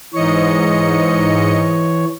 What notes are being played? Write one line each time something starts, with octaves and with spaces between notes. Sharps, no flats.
G#2 E3 C#5 D#5 C#7